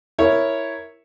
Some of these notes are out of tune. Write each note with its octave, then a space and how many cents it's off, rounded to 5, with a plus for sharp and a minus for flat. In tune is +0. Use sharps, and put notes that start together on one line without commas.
E4 +0 A#4 +0 C#5 +0